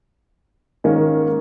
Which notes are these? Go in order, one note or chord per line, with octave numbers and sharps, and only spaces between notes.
G#2 D#3 A#3 C#4